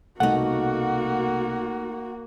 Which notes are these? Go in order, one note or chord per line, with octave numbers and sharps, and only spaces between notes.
C2 B2 A3 A#3 D#4 F#4 F#5